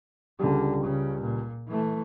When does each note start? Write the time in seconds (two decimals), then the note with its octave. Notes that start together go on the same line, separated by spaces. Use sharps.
0.39 C#2 D3 G3
0.84 C#3
1.21 A#2
1.68 E3 A3